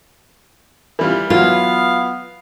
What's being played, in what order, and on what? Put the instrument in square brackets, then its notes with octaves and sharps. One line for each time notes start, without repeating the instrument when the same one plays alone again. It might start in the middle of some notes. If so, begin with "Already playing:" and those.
[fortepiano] E3 G3 F4
[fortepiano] E3 F#3 [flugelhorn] B3 [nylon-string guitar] F4 [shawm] F5